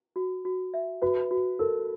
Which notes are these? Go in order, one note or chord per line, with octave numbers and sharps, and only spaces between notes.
F#4
F#4
E5
F#4 B4
F#4
A4 A#4